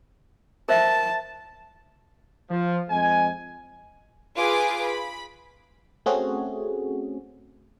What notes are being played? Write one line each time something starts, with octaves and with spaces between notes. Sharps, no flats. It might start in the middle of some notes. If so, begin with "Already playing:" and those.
A#4 C5 E5 A5
F3
F2 G#3 G#5
F4 G#4 B4 G#5 D6
B5
A3 C4 C#4 F#4 G#4